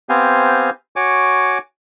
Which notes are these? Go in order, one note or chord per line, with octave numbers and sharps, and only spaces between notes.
B3 C4 G4 C5 F5 G#5
F#4 C#5 G#5 D6